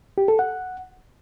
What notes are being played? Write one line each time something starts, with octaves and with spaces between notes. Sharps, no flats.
G4
A4
F#5